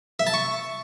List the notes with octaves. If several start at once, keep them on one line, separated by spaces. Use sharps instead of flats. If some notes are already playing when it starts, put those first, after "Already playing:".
E5
A5
C#6